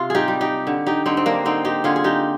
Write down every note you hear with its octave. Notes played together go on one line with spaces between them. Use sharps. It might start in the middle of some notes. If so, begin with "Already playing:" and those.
Already playing: C3 F4
D#4 G4 G#4
G3
D#4 G4
D3
D#4 G4
D3 C4 D#4
C4
A#3 D4
D3 C4 D#4
D#4 G4
D3 F4 G#4
G#4
D#4 G4